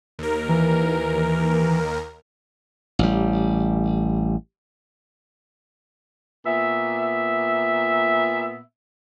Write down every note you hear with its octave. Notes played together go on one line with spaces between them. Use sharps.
D#2 A#4
E3
A1 G3
A#2 B3 E5